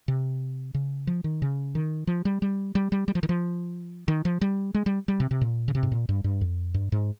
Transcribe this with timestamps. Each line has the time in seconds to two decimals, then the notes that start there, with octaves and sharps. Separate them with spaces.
0.08 C3
0.74 C#3
1.07 F3
1.24 D#3
1.42 C#3
1.75 D#3
2.07 F3
2.25 G3
2.42 G3
2.75 G3
2.92 G3
3.08 G3
3.15 F3
3.23 D#3
3.29 F3
4.08 D#3
4.25 F3
4.41 G3
4.74 G#3
4.86 G3
5.08 G3
5.20 C3
5.31 C3
5.41 A#2
5.68 C#3
5.75 C3
5.83 G#2
5.92 A#2
6.09 G2
6.24 G2
6.41 F2
6.74 G2
6.92 G#2